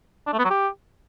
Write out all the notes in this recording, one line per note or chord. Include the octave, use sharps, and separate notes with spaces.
D4
A3
B3
F#3
G4